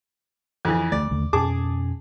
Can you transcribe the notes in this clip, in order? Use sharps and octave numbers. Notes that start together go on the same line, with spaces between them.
F2 E3
D2 A3 D5
D#2 D3 A3
F2 B2 C#4 G#4 A5 D6